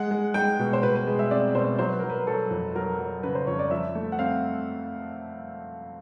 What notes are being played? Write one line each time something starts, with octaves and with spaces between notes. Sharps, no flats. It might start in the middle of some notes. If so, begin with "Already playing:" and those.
Already playing: G#3 F#5
G#3
G#3 G5
B2
C5
B2 B4
B4
G#3
E5
C4 D5
B2 C5
F#3 C5
B4
F#3 A#4
B4
F#3 A4
F2
F#3 A#4
F#3
C#3 B4
C5
F2 C#5
D5
F3 E5
A3
F#5
C4 F5